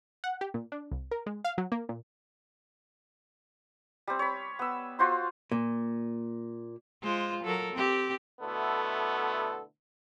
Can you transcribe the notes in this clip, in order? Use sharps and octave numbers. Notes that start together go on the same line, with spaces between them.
F#5
G4
A#2
D4
C2
A#4
G#3
F5
F#3
A#3
A#2
G3 C4
C#5 B5
B3 E6
F4 F#4 C5 C6
A#2
G#3 F4 C5
F#3 A4 A#4
C4 G4
B2 D3 A3 B3 E4 A4